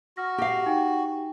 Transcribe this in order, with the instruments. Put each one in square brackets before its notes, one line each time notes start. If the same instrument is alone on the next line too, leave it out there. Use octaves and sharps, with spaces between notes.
[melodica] F#4 [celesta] F6 A#6
[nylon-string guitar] G4 F5
[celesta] D#4 G5 G#5